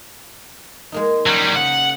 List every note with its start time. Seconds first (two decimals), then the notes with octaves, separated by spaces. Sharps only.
0.92 G#3 A#3 D#4
1.26 F#3 G3 C#4
1.56 C#3 F#5